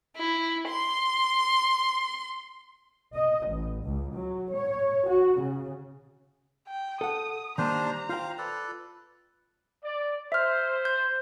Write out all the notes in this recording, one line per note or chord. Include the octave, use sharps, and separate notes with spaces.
E4
C6
D#5
A1
C#2
F#3
C#5
F#4
C#3
G5
A4 F#5 D#6
D#3 G3 A#3 D4 C5 A#5
F4 C5 F5 G5
A4 B4 D5
D5
C5 E5 F6
G6